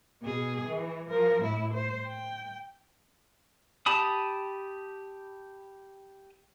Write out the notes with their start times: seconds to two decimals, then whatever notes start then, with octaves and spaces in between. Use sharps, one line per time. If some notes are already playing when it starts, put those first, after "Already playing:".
0.22 B2 G#4
0.68 E3
1.10 F3 A#4
1.43 A2 E4
1.74 C5
2.09 G5
3.86 G4 A5 B5 D#6